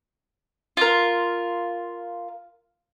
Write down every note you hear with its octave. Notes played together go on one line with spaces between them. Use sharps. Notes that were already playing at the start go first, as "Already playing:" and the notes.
F4 A#4